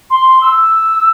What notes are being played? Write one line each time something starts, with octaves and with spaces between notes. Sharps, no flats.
C6
E6